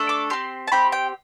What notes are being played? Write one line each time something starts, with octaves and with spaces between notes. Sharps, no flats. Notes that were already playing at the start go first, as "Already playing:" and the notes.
Already playing: A3 D4 A4
D6
C4 G4 C6
A5
C4 G4 B5
G5